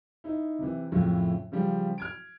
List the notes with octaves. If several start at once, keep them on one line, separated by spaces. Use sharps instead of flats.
D#4 E4
C3 E3
F2 A2 C#3 E4
C#3 F3 G3
F6 G#6 D7